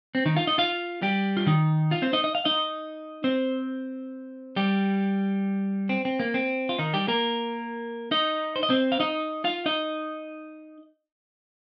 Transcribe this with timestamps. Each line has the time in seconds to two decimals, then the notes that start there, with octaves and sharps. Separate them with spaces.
0.15 C4
0.26 D#3 D#4
0.36 F4 F5
0.47 D#4 D#5
0.58 F4 F5
1.02 G3 G4
1.37 F4
1.47 D#3 D#4
1.91 F4 F5
2.02 C4 C5
2.13 D#4 D#5
2.24 D#5
2.35 F5
2.45 D#4 D#5
3.24 C4 C5
4.56 G3 G4
5.89 C4
6.05 C4
6.20 A#3
6.34 C4
6.69 F4
6.79 D#3 D#4
6.93 G3 G4
7.08 A#3 A#4
8.11 D#4 D#5
8.56 C5
8.63 D#5
8.70 C4 C5
8.92 F5
9.00 D#4 D#5
9.44 F4 F5
9.66 D#4 D#5